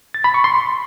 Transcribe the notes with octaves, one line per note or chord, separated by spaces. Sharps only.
A6
B5
C#6
C6